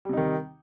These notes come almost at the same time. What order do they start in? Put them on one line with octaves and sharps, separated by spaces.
G3 C3 D#4 D#3